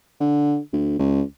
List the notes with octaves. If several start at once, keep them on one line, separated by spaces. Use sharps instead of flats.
D3
D2
C#2